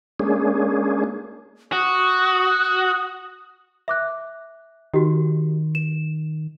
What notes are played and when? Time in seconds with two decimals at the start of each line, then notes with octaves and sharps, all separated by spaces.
0.20 G#3 A#3 C#4 D4 G#4
1.72 F#4 D#6
3.88 E5 D6 F#6
4.94 D#3 F#4 G4
5.75 E7